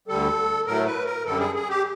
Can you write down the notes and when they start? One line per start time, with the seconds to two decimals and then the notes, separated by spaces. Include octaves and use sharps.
0.08 D2 D3 G3 A4
0.66 A2 F#3 A3 A#4
0.86 B4
1.06 A#4
1.25 F#2 D3 G3 A4
1.40 G#4
1.55 G#4
1.69 G4